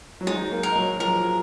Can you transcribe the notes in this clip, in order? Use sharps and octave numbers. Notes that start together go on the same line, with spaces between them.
F#3
G#3 D#4
A#3
A#4
F#3
F3 A#4